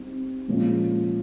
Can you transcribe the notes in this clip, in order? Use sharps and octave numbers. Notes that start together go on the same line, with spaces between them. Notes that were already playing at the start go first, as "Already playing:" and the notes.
Already playing: G3 C4 D#4
A#2 F3 G#3 C#4 F4